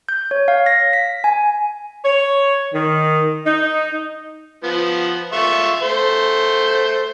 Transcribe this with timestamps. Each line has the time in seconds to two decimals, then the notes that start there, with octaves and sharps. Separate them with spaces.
0.09 G6
0.31 C#5
0.48 F5
0.66 A#6
0.93 B6
1.24 G#5
2.05 C#5
2.74 D#3
3.46 D#4
4.64 F3 B3
5.33 F4 E5 C#6
5.82 A3 C5